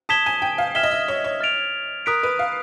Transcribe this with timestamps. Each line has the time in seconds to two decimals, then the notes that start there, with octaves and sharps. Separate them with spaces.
0.09 A5 D#6 G#6 B6 E7 G7
0.26 G#5
0.42 G5
0.58 F5
0.75 E5 F6 G#6 B6 E7 G7
0.83 D#5
0.91 E5
1.08 C#5
1.24 C#5
1.41 F6 A6 D7 F7
2.06 A#4 D#6 F#6 B6 D7
2.23 B4
2.39 F5